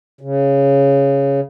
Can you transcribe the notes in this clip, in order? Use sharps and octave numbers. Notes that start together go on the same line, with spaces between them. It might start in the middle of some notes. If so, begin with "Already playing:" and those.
C#3